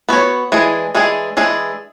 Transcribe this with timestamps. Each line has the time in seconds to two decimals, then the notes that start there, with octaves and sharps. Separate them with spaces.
0.09 B3 F#4 C#5
0.52 E3 G#3 D4 G#4
0.95 E3 G#3 D4 G#4
1.37 E3 G#3 D4 G#4